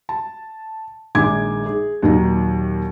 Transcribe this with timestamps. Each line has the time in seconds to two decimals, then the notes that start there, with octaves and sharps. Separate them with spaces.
0.09 A5
1.15 A#1 D#3 G#3 G#5 D6 G#6
1.66 G#4
2.03 D#2 A#2 D#3 F#3 D#4